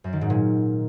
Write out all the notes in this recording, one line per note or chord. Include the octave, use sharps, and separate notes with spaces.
F#2
D#3
G#2
A#2